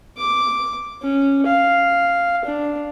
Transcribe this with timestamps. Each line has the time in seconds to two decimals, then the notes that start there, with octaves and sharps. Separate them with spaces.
0.17 D6
1.02 C#4
1.47 F5
2.45 D4